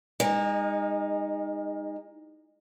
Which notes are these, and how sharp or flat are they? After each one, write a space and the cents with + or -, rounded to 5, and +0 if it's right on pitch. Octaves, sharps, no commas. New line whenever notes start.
G#3 -35 D#4 +0